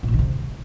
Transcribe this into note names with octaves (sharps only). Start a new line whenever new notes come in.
B2
A#2
D#3
C3